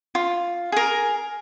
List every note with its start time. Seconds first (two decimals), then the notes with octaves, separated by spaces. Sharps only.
0.15 F4
0.72 G#4 A#4